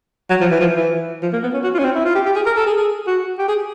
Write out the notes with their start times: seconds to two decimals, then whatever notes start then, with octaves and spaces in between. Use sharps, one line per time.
0.30 F#3
0.41 F3
0.51 E3
0.61 F3
0.77 E3
1.22 F3
1.33 A#3
1.43 B3
1.54 C#4
1.64 F#4
1.74 F4
1.79 C#4
1.85 C4
1.95 E4
2.05 F4
2.15 G4
2.26 G4
2.36 G#4
2.46 A#4
2.57 A4
2.67 G#4
2.77 G#4
3.07 F#4
3.39 G4
3.49 G#4